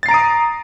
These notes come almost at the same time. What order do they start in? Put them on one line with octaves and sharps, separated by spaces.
A6 C7 A#5 D7 D#6